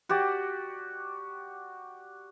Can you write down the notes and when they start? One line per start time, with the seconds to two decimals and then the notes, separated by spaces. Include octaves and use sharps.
0.09 F#4 G4 D5